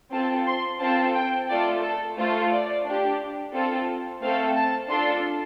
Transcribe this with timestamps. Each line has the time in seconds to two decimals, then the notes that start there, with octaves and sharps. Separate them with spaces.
0.13 C4 F4 A4 A5
0.47 C6
0.81 C4 F4 A4 A5
1.14 G5
1.49 A3 F4 A4 D5
1.83 A4
2.17 A3 F4 A4 C5
2.51 D5
2.85 D4
2.91 G4
3.54 C4 F4 A4
4.21 A3 C4 A4 F5
4.57 A5
4.90 D4 F4 A4 C6